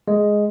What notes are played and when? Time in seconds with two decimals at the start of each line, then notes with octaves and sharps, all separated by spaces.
0.08 G#3